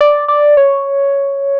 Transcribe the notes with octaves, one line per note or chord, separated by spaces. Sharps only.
D5
D5
C#5